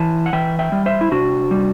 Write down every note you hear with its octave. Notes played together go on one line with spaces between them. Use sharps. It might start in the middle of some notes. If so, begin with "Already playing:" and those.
Already playing: E3 A5
F#5
E3 E5 G5
E5 G5
G3
C5 E5
E4
C3 D4 F#4
G3